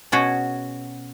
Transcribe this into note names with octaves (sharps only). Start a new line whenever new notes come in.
B2 C#4 F#4 G#4